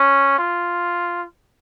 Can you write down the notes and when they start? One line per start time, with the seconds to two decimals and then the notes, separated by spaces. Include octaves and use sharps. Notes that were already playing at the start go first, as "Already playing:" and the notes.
Already playing: C#4
0.38 F4